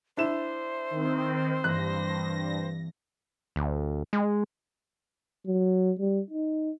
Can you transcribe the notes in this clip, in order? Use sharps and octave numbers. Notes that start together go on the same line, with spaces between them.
D4 E4 C5 E7
D#3 C4
G2 E3 A#3 C4 F#6 A#6
D2
G#3
F#3
G3
D#4